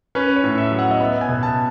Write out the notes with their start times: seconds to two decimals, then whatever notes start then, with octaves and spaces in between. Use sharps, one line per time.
0.15 C#4 B4
0.36 C#5
0.44 A2
0.58 E5
0.72 F#3
0.79 F#5
0.91 D#5
1.00 B3 E5
1.21 G#5
1.29 B2
1.43 A5